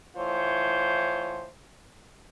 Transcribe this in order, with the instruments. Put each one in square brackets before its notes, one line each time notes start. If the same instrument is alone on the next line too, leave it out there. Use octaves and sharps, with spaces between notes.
[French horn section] A2 E3 F4 C5 C#5